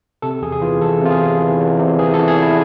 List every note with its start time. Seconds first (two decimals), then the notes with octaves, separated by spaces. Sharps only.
0.22 C3 A4
0.42 E2 G#4
0.52 G#4
0.62 E3 F4
0.81 E2 A4
1.01 C3 F4
1.11 G#4
1.21 E2
1.40 E3
1.60 E2
1.79 C3
1.99 E2 G#4
2.14 A4
2.19 E3
2.28 G#4
2.38 E2 E4